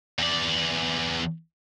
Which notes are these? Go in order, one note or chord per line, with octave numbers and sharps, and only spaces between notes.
E2 D5